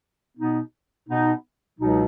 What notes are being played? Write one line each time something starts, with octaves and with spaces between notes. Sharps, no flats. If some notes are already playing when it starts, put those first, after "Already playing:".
B2 B3 D#4
B2 B3 D#4
C#2 B2 F#3 D#4